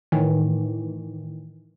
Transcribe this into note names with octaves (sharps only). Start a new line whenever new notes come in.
A2 D#3 E3